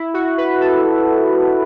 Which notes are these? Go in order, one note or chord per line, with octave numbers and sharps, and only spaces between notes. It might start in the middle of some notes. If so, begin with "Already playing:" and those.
Already playing: E4
F#4
B4
A4